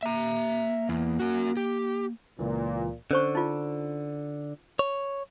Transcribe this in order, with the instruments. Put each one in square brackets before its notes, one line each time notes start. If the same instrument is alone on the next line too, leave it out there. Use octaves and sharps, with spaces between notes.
[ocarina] A#3 [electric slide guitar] E5 A#5
[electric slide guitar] E2
F#4 A#4
G4
[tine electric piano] C#2 E3 [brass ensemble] A#2
[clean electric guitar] D3 [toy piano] C#4 C5 C#6
[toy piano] D#4 F4
[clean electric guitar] C#5